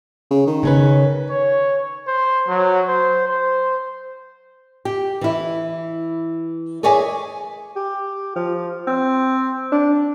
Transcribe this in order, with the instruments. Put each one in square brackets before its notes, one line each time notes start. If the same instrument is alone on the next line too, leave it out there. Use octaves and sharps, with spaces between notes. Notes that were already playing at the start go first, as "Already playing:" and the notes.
[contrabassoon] C#3
D#3
[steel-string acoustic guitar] C#3 C#4 B4
[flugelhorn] C#5
C5
F#3
C5
C5
[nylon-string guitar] G4
E3 E4
G#4 A#4 C#5 D5 E5 G#5
[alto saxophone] G4
F3
C4
D4